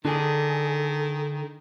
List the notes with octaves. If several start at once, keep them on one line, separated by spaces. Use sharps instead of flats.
D3 D#3 D4 G#4 A4